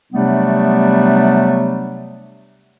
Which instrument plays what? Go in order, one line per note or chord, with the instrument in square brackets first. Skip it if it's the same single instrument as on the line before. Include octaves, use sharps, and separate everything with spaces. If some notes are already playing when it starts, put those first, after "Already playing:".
[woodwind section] C3 F#3 G3 A3 B3 D4